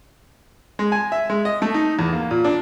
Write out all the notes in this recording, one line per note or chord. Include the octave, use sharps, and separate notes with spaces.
G#3
G#5
E5
G#3
D#5
A3
D#4
E2
A#3
A#2
D4